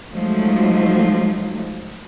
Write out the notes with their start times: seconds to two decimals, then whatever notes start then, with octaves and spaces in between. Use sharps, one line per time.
0.13 F3 F#3 G#3 A3 D#4